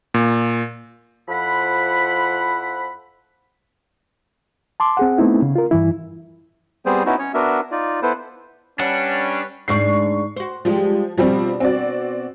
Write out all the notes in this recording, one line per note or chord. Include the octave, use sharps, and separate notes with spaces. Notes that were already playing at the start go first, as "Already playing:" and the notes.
A#2
F2 F3 E4 F#5 B5
A5 C6 D6
C4 G#4 F#5
A3 B3 C4 D#4 E4
C#3
F4 A#4
G2 E3 E4
G3 B3 C4 G#4 C5
B3 C#4 D#4 E4 F#4
C#4 C#5
B3 D4 F#4 A#4 E5
D#4 F4 D5
B3 E4 A4 B4 C5
G3 C#4 D4 B4 C#5 F#5
D2 G#2 D4 C#6 C7
F#4 C5
F3 G3 G#3 G4
B2 F3 G3 C4 D4
C4 F#4 D5